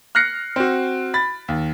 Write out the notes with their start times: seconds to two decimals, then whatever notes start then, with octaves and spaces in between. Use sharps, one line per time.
0.15 F6 F#6 A#6 C7 C#7
0.56 C4 F#4
1.14 B5 A6
1.48 D#2